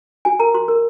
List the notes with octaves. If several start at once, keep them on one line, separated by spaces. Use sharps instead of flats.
F#4 G#5
A#4 A#5
F#4 C6
A#4